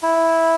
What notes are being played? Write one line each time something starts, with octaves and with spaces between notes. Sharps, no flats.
E4